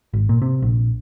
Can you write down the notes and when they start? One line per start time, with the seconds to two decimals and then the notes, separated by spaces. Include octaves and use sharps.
0.13 G#1
0.29 A#2
0.42 C3
0.62 A#1